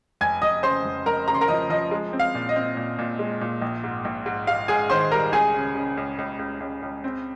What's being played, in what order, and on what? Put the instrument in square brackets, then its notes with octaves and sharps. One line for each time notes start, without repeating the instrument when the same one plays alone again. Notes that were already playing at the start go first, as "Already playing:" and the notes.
[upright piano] F1 G#5 G#6
F1 D#5 D#6
C#3 C5 C6
F1
F1 A#4 A#5
C#3 A#5
C6
A#4 A#5
F3 D#5
F3 D#5
G#3
C4
F5
A#2
D#5
C4
A#2
A#2
G#3
A#2
A#1
G#2
A#1
G#2
G#2 F5
G#2 G#4 G#5
D#3 C5 C6
G3 A#4 A#5
C#2 G#4 G#5
C#3
C#3
C#2
C#2
C#2
C#2
C#2
C4